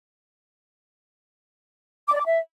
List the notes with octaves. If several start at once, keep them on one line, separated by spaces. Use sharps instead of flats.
D6
D5
D6
E5